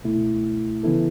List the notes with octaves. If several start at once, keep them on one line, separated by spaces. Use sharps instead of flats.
C#2 B2 A3 E4
C#3 E3 B3 E4 A4